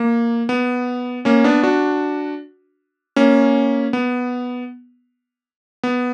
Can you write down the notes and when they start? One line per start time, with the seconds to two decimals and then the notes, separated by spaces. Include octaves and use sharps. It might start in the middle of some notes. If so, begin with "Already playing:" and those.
Already playing: A#3
0.49 B3
1.25 A#3 C#4
1.44 B3 D4
1.63 D4 F#4
3.16 A#3 C#4
3.93 B3
5.83 B3